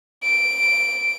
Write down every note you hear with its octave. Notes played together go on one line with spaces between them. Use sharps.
D7